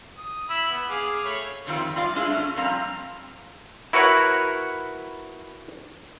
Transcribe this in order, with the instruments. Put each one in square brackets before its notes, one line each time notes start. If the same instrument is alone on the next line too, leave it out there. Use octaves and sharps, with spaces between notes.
[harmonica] D#6
E4 B5 E6
B3
G#4 F5 D6
A3 C#5 B5
[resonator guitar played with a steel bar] F2 D#3 G3 C4 F4
G3 F4 F5
G#3 D4 E4 F4 G#4
A3 C4 C#4
A#2 F3 G3 C4 F5 A#5
[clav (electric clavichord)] E4 F#4 A#4 B4 C#5 F#5